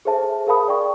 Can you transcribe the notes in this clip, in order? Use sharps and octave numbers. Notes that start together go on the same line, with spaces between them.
G#4 A4 C5 E5 A5
G#4 A#4 F5 A5 B5 D#6
D5 G5 C#6